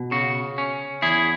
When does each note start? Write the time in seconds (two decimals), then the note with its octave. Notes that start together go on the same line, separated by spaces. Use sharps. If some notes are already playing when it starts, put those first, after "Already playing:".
Already playing: B2
0.11 C#3 F#4
0.58 C#4
1.02 E2 E4 G#4